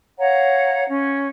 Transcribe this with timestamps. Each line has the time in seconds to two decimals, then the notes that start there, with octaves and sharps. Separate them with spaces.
0.19 C#5 F5 F#5 A#5
0.89 C#4